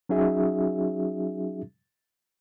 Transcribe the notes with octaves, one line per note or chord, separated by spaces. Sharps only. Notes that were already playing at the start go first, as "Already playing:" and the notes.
F#3 C#4 D#4 F#4 G#4 E5